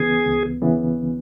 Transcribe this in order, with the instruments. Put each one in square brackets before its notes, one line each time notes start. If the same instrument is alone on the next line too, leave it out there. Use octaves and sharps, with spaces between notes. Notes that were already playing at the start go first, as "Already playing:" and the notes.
Already playing: [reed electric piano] C#2 C#3 E3 B3 [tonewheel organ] G#4
[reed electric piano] C#2
C#3 E3 B3